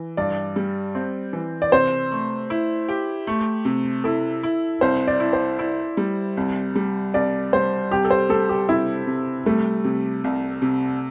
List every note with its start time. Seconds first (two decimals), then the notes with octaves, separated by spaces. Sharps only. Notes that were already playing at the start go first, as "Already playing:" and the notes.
Already playing: E3
0.17 G2 D5
0.56 G3
0.95 C4
1.33 E3
1.62 D5
1.72 C3 C5
2.11 A3
2.50 E4
2.88 G4
3.27 A3
3.65 C3
4.04 E4 A4
4.43 E4
4.81 C2 C5
5.07 D5
5.20 E4
5.33 C5
5.59 E4
5.97 G3
6.37 C2
6.76 G3
7.14 C2 D5
7.53 G3 C5
7.91 C2 G4
8.05 A4
8.11 C5
8.29 G3 A4
8.49 G4
8.68 C3 E4
9.07 C3
9.46 G3 A3
9.84 C3
10.24 C2
10.62 C3